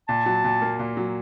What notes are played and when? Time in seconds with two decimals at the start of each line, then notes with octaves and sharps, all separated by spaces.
0.09 A#2 A5
0.26 F#3
0.44 A#2
0.62 A#3
0.79 A#2
0.97 F#3